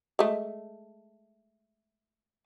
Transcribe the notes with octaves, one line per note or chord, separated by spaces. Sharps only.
G#3 A3